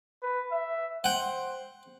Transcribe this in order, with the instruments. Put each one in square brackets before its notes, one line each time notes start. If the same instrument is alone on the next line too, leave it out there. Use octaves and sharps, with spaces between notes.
[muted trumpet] B4
E5
[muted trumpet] C5 [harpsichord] F#5 G5